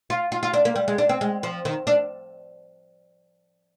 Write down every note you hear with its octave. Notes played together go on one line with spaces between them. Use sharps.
F4
F4
F4
D4
A#3
G3
G#3
D4
C4
G#3
F3
D#3
D4